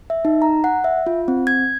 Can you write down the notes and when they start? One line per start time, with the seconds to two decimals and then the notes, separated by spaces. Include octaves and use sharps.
0.10 E5
0.25 D#4
0.42 A#5
0.64 F#5
0.84 E5
1.07 F4
1.28 C4
1.47 G#6